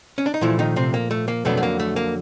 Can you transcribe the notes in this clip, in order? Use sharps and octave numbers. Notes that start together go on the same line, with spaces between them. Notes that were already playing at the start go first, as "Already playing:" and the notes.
C#4
D4
D#4
A#2 E3 F3 A3 E4
D#3 D#4
C3 C4
A#3
A3
A#3
F2 B2 D3 F#3 A3 B3
A3
A#3
A3
A#3